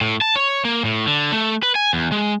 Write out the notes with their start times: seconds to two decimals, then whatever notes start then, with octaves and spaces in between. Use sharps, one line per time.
0.01 A2
0.21 A5
0.36 C#5
0.65 A#3
0.85 A2
1.07 D3
1.32 A3
1.63 B4
1.75 G#5
1.93 E2
2.12 G#3